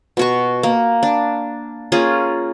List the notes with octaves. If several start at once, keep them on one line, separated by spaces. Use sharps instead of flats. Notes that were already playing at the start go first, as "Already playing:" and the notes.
B2 F#4 C#6
A#3
D4
A#3 C#4 F4 G#4